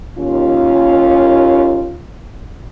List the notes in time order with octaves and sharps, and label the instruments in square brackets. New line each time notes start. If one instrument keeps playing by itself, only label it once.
[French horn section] D#2 C#4 F4